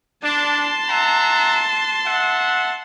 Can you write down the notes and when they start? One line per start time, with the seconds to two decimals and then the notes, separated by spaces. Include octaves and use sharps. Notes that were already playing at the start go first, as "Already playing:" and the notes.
0.23 D4 A5 C6
0.89 E5 F#5 A#5
2.05 E5 F#5